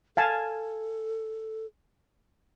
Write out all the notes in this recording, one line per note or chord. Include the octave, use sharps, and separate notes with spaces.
A4 F5 G#5 A5